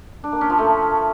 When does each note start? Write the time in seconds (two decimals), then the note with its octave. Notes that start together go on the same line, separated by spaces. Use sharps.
0.24 D4
0.32 A#3
0.41 C#4
0.50 F3
0.58 A3